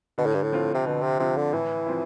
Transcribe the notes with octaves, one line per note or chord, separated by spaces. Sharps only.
B2 D3
A2
G2
A2
F3 C4 F4
C3
B2 D3
C3
C3 F3 C4 F4
D3
A2 E3
F3 C4 E4